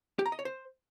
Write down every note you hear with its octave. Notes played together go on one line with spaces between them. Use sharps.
G4
A#5
D#5
C#5
C5